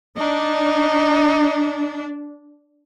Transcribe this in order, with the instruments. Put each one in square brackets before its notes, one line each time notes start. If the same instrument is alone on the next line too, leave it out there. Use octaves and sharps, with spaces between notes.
[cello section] D4 [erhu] D#4